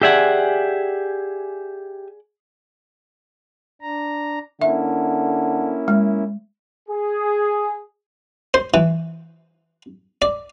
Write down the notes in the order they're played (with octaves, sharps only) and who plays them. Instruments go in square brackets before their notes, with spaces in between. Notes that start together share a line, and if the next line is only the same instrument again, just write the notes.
[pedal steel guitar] G4 E5 G#5 [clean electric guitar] G#4 D5 F#5
[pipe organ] D4 A#5
[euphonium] D3 [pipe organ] A#3 C#4 E4 [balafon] E5
[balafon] G#3
[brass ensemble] G#4
[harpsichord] C5
E3
D5